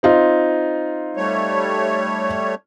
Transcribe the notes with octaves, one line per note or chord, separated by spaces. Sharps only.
C4 D#4 F4
G3 A3 C#5